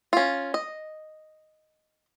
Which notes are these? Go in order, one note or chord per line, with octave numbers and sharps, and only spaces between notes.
C#4 F4
D#5